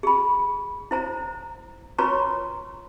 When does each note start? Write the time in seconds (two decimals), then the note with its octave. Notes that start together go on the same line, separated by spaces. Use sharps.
0.03 G#4 B5
0.91 E4 C5 A#5
1.98 F4 B4 C#5 A#5 C6 C#6